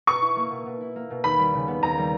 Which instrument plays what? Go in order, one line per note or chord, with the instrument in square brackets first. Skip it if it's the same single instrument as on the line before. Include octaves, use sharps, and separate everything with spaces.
[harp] B2 [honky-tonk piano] C#6
[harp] E4
A#3
B2
B2
E4
A#3
B2
[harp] D#2 [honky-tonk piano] B5
[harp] G3
C#3
B3
[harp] D#2 [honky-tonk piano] A#5
[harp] G3